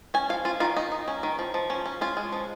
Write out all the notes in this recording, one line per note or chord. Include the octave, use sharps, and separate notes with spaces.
C#4 G#5
F3 F5
C#4 F4
D#3 F4
D#3 D#4
D#4
C#4
D#3
F3
F3
C#4
C#4
C#4 F4
G#3
F3